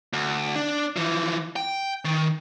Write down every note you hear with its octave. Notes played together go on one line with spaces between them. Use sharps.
D2
D4
E3 F3
G5
D#3